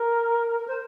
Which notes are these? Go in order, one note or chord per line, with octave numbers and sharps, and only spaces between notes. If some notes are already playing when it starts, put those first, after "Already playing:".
Already playing: A#4
A#4
C5